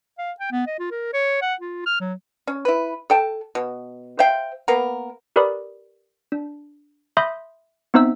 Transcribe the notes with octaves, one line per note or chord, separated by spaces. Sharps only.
F5
G5
B3
D#5
F4
A#4
C#5
F#5
F4
F6
F#3
C#4
E4 B4
A4 G5 A5
B2
C5 E5 F5 G5
A#3 B3 A#4
G4 A#4 B4 D5 B5 D#6
D4
E5 B5 C6 D#6 G6 A#6
B3 C4 D#4 C5 E5 E6